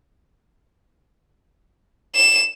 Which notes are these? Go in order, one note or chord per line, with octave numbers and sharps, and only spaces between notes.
E7